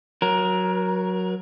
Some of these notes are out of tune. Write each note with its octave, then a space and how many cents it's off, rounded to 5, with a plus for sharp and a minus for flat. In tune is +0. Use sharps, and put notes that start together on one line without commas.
F#3 -5 A#4 +20